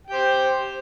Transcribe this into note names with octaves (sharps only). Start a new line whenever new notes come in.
G4 C5 G5